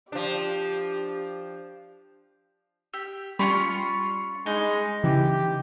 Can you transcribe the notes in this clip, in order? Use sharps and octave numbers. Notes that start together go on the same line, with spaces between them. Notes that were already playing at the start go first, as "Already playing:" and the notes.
F3 D4 G4
G4 E6
G3 C#4 D4 F4 B5 C6 C#7
G#3 D#4
C#3 E3 G4